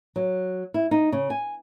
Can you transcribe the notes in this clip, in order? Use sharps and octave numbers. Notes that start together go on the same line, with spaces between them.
F#3
E4
D#4
C#3
G#5